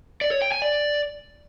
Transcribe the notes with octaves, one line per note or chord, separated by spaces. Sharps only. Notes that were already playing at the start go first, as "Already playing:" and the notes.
D5
C#5
G5
G#5
D5